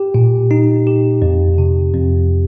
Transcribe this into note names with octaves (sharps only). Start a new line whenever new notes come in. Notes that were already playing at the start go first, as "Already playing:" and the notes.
Already playing: G4
A#2
D#4
G4
F2
C3
F2